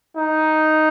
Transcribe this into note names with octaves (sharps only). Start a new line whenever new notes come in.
D#4